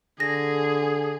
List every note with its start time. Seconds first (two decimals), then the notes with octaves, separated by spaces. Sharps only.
0.20 D3 G#4 A#6